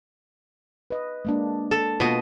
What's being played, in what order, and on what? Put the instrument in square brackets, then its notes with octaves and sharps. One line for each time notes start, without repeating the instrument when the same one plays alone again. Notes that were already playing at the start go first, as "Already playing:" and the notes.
[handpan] B4 D#5
G#3 A#3 D4
[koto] A4
[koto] B2 D#5 [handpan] A#3 B3 F4